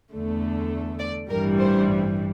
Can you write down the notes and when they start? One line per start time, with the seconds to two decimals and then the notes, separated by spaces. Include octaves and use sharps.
0.12 E2 D3 A3
0.99 D5
1.29 A1 G2 E3 G3 A#4
1.59 C5